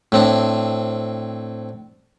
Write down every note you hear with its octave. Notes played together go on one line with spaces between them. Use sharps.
A2 C4 D4